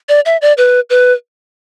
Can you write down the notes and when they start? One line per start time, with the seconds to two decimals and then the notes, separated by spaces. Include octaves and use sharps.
0.09 D5
0.26 E5
0.42 D5
0.58 B4
0.90 B4